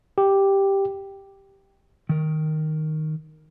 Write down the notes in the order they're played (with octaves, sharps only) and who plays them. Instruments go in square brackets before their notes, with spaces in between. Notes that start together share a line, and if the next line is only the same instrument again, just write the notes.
[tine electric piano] G4
[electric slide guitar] D#3 A#4